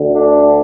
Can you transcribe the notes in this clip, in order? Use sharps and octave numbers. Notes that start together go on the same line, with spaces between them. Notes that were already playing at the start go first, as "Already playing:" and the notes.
Already playing: D2 D3
D4